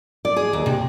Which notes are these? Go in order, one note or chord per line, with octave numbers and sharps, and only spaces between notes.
D5
G#4
D#2
C3